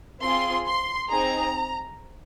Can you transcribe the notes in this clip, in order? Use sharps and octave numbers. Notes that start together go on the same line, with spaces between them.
C4 F4 G#4 C6
C6
C4 D#4 G#4 A#5